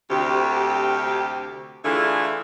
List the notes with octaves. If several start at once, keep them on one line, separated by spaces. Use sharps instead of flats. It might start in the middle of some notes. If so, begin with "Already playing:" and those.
D2 C3 G4
D3 E3 A3 F4 G#4 E5